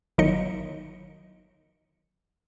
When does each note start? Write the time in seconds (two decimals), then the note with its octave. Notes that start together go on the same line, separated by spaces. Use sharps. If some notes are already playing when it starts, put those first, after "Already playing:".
0.18 G1 D#3 F#3 D#4 D#5 C#7